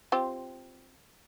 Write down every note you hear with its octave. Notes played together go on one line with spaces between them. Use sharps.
C4 F4 G4